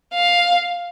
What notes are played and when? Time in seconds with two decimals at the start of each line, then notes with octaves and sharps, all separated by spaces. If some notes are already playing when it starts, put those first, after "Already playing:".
0.14 F5